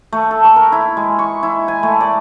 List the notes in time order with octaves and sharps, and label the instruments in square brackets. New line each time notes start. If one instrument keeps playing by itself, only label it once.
[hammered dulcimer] A3
A4
C#6
A#4
E4
G#3
C#6
E4
G#5
A3
D5